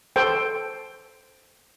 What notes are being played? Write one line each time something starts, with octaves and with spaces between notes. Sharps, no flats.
A4 C5 G5